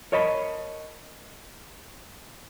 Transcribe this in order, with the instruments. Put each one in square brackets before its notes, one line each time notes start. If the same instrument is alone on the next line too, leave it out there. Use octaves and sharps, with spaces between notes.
[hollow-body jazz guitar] A#4 C#5 D#5 A5 B5